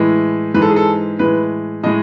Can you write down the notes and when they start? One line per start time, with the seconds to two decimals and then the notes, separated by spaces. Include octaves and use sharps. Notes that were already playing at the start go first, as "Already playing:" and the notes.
Already playing: A2 E3 G#3
0.54 G#2 E3 G#3 B4
0.62 A4
0.69 G#4
0.76 A4
1.19 A2 E3 G#3 B4
1.83 A2 G#3 D#5